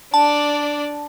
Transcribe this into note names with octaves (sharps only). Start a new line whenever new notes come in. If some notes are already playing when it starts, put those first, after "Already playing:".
D4 D5 A5